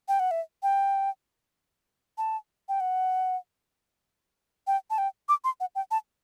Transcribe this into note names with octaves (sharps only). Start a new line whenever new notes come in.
G5
F#5
E5
G5
A5
G5
F#5
G5
A5
G5
D6
C6
F#5
G5
A5